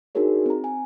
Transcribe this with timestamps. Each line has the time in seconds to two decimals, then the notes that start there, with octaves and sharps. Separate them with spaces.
0.15 D4 D#4 F#4 G#4 A#4 C#5
0.46 C4 A#5
0.64 G#5